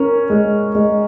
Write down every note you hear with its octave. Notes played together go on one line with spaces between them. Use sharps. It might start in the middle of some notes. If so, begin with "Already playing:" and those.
Already playing: C#4 A#4
G#3
G#3